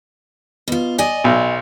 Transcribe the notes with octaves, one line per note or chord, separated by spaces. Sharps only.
B2 F4
D5 D#5 G#5
B1